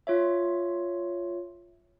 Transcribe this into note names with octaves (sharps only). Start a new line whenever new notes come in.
F4 C#5 E5